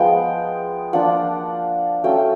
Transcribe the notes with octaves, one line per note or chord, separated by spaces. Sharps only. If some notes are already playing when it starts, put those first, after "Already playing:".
Already playing: F3 G#3 B3 G5
F3 A#3 D4 F4 F#5
F#3 A3 C#4 F4 G5